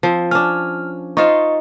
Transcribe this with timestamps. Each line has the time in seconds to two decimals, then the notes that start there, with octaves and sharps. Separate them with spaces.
0.03 F3 C4
0.31 C#4 D4 F6
1.17 D#4 F4 C5 D#5 C#6